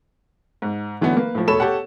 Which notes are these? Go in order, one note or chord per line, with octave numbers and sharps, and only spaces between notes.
G#2
D3 E3 F#3 A3 B3
A#3 B4
A2 F3
E1 A3 A4 C#5 B5 E7
G4 A4 C#5 F#5